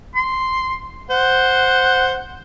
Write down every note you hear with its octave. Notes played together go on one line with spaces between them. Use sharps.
C6
C5 F#5